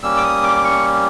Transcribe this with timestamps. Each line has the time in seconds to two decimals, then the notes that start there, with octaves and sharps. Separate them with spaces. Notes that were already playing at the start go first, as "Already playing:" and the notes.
0.02 G3 A#3 C#4 E6
0.17 D6
0.23 D#6
0.43 D6
0.64 C#6